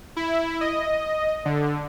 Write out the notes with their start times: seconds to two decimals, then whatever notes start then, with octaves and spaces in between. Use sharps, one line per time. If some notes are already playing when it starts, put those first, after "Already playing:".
0.16 E4
0.61 D#5
1.45 D3